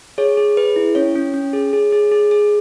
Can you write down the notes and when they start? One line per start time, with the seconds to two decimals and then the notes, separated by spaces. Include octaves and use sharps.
0.18 G#4 C#5
0.37 G#4
0.57 G#4 B4
0.76 E4
0.95 C#4 C#5
1.15 C#4
1.34 C#4
1.53 G#4
1.73 G#4
1.92 G#4
2.12 G#4
2.31 G#4